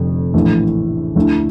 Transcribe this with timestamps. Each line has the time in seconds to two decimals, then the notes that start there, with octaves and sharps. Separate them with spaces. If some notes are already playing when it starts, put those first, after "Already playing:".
Already playing: F1 F2 D3
0.33 A#1 A2 E3 A3
1.16 D2 D3 A3 E4